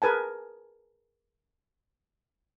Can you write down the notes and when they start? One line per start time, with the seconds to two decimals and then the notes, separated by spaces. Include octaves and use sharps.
0.02 G#4 A#4 B4 G#5 A5